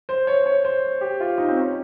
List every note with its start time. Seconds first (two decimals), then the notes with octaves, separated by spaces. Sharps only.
0.09 C5
0.27 C#5
0.46 C#5
0.64 C5
1.01 G4
1.20 F4
1.38 D#4
1.48 C4
1.57 C#4